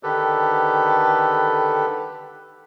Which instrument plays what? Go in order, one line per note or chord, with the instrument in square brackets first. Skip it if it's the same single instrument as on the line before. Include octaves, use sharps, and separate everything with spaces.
[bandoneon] D3 D#3 G4 A4 B4